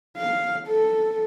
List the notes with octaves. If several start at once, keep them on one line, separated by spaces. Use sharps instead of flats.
F5
A4